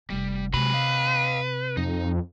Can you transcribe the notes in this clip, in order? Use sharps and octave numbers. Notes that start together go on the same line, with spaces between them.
F1 G3
C3 F#3 G#3 B4
D#5 F5
F2 D#4